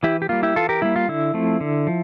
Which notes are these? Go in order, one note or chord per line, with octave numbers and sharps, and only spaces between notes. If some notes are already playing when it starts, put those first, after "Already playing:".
E3 E4 G4
G4
G3 A#3 F4
E4 G4
E3 F4 A4
G4 A#4
G3 A#3 E4
F4
D3 E4
F3 A3 C4
D3
F3